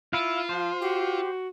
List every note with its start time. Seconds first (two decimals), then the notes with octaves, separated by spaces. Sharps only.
0.13 E4 F4 F5
0.49 F3 C5
0.82 F#4 G4